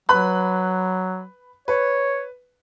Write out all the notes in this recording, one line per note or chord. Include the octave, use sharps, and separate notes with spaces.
F#3 B4 B5 F#6
B4 C#5